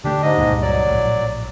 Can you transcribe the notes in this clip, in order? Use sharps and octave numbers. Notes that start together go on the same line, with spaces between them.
D3 A3 D4 G4
G#2 D#5
C#2 G2 A#2
F#3 D5
A#1 A2